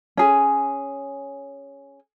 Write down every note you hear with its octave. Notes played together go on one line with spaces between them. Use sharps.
C#4 G#4